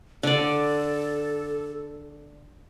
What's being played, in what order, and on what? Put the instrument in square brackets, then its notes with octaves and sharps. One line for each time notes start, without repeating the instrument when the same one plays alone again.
[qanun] D3 D5 [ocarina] A4